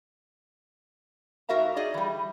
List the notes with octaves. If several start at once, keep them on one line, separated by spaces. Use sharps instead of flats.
G#2 F#4 A#4 E5 F5 A#5
D#4 G#4 D5 D#5
E3 G3